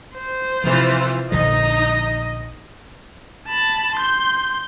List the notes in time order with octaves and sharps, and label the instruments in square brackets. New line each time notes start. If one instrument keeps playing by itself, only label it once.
[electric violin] C5
[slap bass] C3 F3 [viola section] E3 F4
[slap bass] A#1 D3 F3 [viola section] D#4 [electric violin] D#5
[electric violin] A5 B5
C6 G6